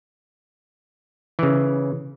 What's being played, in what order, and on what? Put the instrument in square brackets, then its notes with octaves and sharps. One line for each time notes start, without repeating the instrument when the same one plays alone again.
[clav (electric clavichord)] C#3 E3